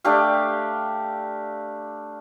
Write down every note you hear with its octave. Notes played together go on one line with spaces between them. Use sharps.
A3 D4 G4 F5